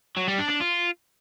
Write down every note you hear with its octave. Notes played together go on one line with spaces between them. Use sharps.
F#3
G3
D4
D4
F4